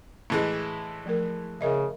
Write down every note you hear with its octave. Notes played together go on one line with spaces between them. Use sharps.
A2 E3 G#3
F3 A3 A#4
C#3 A#4 D#5 E5